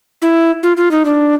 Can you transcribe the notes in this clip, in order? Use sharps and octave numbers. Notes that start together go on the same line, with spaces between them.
E4
F4
F4
D#4
D4